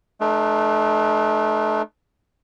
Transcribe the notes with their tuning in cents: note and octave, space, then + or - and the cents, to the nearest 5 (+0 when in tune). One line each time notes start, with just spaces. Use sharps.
A3 -30 D4 +45 B4 -45